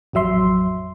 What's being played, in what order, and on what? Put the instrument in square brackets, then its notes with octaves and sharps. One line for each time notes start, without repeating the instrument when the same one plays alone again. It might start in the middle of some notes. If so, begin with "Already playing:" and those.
[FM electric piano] A1 F2 F#3 E5 C6